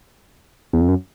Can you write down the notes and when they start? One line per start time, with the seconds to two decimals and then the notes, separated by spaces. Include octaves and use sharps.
0.73 E2
0.81 F2
0.89 F#2